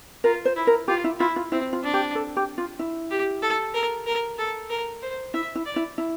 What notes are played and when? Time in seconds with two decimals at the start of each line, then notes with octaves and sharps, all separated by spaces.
0.24 F4 A#4
0.45 C5
0.56 E4
0.67 A#4
0.88 F4 G4
1.04 E4
1.20 E4 F4
1.36 F4
1.52 C4 E4
1.73 F4
1.84 D4
1.94 G4
2.15 A4
2.37 G4
2.58 F4
2.79 E4
3.11 G4
3.42 A4
3.74 A#4
4.07 A#4
4.38 A4
4.70 A#4
5.02 C5
5.34 E4 E5
5.55 E4
5.66 D5
5.76 E4
5.98 E4